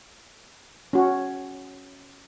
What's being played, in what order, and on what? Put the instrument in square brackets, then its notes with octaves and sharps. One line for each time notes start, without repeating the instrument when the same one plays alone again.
[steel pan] C#4 F#4